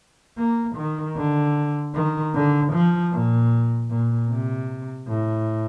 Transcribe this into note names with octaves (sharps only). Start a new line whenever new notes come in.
A#3
D#3
D3
D#3
D3
F3
A#2
A#2
C3
A2